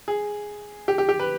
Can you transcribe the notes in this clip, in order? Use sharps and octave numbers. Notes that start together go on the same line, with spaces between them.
G#4
G4
G4
G4
B4